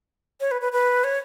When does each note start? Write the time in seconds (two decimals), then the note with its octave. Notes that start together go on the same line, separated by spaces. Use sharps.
0.41 C#5
0.51 B4
0.62 B4
0.72 B4
1.04 C#5